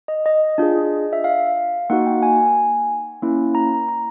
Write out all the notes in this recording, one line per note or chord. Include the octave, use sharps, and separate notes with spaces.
D#5
D#5
D4 F4 G#4
E5
F5
A#3 D#4 F#4 F#5
G5
G#5
A#3 C#4 E4
A#5
A#5